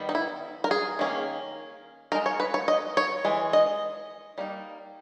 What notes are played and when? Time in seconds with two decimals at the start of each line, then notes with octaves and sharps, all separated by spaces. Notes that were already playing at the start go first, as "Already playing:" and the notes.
Already playing: D#3 G3 B3
0.09 D#4
0.15 E4
0.64 A#4
0.71 G#4
0.99 D#3 A#3 C#4
2.12 G#3 D#4 A#4
2.26 C#5
2.40 B4
2.54 C#5
2.68 D#5
2.97 C#5
3.25 E3 G#3
3.53 D#5
4.38 G3 A#3 D#4